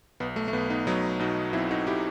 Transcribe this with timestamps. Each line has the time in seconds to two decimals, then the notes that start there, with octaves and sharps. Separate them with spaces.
0.20 B1 B3
0.36 A3
0.48 A3
0.53 B1 B3
0.70 B3 D#4
0.87 F#3 B3 D#4
1.20 B2 D#4 F#4
1.53 B1 C4 E4
1.71 D#4 F#4
1.87 E4 G4